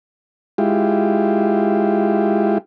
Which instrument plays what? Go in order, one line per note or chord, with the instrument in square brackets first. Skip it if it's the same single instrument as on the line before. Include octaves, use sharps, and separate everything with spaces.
[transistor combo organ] G#3 E4 F4 G4